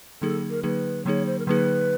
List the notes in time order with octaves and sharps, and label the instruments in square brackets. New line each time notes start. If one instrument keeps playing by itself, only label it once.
[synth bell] D3 F#3 A#3 D#4 G#4 [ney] A4
[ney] A#4
[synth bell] D3 F#3 A#3 D#4 G#4 [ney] B4
[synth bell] D3 F#3 A#3 D#4 G#4 [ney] C#5
[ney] C5
A#4
[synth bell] D3 F#3 A#3 D#4 G#4 [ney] B4